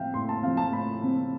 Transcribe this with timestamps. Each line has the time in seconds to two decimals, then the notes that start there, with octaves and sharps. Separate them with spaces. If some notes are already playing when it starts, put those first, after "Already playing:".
Already playing: A2 F3 C4 E5 F5 G5
0.14 A2 C6
0.29 A5
0.43 F3 C4 F5
0.57 A5
0.72 A2 B5
1.03 F3 C4